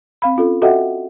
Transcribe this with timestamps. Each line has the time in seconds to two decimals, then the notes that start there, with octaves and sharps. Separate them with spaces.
0.22 C4 F5 B5
0.36 C#4 F4 A4
0.62 F#4 A4 D#5 E5 F#5 G5